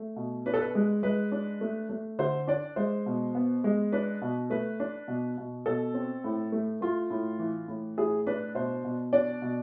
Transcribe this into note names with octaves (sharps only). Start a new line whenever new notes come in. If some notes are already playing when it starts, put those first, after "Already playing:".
Already playing: A3
B2
D4 B4
A4
B4
G#3
G#3 B4
D4
A3
A3
D3 C5
D4 D5
G#3 C5
B2
B3
G#3
D4 B4
B2
A3 B4
D4
B2
B2
B2 A4
C4
A2
A3
A3 F4
A2
E3
A2
A2 G#4
D4 B4
B2 C5
B2
D4 D5
B2